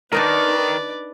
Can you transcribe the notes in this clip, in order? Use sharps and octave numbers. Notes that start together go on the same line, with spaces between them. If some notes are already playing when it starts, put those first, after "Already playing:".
D#3 D4 D#4 A#4 B4 D5